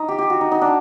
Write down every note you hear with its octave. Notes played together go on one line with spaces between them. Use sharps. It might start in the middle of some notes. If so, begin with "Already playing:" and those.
Already playing: D#4
G4
G4
F#4
D#4
D#4
D4